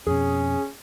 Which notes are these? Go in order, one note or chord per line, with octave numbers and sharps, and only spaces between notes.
F2 B2 C#4 G#4